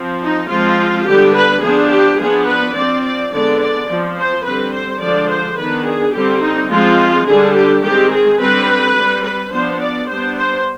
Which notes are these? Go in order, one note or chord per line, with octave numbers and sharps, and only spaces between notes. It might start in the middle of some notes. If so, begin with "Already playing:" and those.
Already playing: F3 C4
D#4
F3 G#3 C4 F4
D3 G3 B3 D4 G4
B4
F3 B3 D4 G#4
G4
F3 B3 D4 G#4
B4
F3 C4 D5
D5
D3 G#3 B3 D4 D5
D5
F3 C4
C5
D3 G3 C4 B4
C5
D3 F3 G#3 D4 D5
C5
D#3 B3 D4 B4
G#4
D3 G3 C4 G4
D#4
F3 G#3 C4 F4
D3 G3 D4 G#4
G4
D#3 G#3 C4 G4
G#4
D3 G3 C4 B4
G3 C4
B4
F3 B3 D4 C5
D5
G3 B3 D4 C5
C5